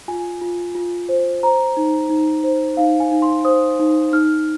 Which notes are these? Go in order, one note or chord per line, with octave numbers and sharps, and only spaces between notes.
F4 G#5
F4
F4
C5
C5 A#5
D#4
D#4
C5
D#4 F5
G#5
D#4
C6
C5 D#6
D#4
D#4 F6